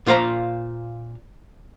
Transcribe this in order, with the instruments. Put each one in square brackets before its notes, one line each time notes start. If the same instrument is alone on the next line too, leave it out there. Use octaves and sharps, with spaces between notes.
[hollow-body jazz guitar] A#2 F4 C5 F5 A#5